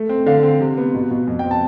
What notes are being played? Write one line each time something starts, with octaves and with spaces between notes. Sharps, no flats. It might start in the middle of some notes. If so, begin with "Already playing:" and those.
Already playing: A3
C4
D3 F5
C4
C3
B3
B2
B2
F2
C4 G5
A5